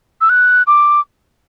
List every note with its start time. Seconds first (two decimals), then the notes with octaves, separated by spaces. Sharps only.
0.21 E6
0.29 F#6
0.67 D6